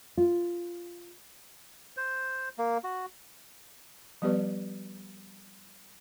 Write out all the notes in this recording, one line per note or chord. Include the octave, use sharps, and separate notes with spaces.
F4
C5
A#3
F#4
F3 G3 B3 G4 B4 D5